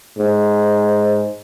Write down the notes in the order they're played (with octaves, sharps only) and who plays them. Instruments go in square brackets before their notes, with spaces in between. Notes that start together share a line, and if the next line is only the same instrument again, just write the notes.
[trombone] G#2